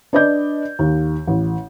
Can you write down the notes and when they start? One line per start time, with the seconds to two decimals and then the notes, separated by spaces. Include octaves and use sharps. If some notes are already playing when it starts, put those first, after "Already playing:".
0.13 D4 B4 D5 D#5 G6
0.79 D#2
1.27 A1